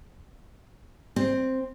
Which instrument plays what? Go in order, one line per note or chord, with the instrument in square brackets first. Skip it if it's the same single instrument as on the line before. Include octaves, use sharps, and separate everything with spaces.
[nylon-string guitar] C4